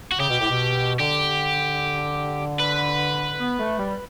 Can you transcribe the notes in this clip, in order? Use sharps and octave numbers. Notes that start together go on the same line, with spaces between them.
F#4
C#3 G4
B2
A2
B2
D3 G4
B4
B3
A3
G3